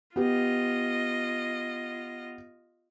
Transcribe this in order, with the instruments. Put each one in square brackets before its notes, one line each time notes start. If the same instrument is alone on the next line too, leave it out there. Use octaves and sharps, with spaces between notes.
[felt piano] B3 G4 [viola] F4 D#5